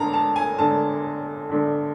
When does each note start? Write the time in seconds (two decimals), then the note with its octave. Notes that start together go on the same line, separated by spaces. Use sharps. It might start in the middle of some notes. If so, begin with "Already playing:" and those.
Already playing: G1 G2 D3 A5 A#5
0.13 A5
0.36 G#5
0.58 G1 G2 D3 A5
1.49 G1 G2 D3